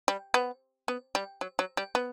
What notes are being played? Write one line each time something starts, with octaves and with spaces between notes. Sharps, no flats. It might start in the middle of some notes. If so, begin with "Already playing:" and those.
G3
B3
B3
G3
F#3
F#3
G3
B3